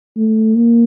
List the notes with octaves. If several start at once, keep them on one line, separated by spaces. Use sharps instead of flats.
A3
A#3